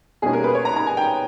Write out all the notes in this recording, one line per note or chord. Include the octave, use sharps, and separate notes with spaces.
B2 G3 A#3 C#4 G#4
A#4
B4
C#5
A#5
A#5
G#5
G5